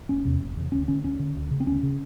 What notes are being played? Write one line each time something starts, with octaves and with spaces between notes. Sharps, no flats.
F#1 C#4
E2 C3
F#1
E2 C3
D2 C#4
D3 C#4
D2 C#4
D3
D2
C#3
C4
D2 C#4
C#3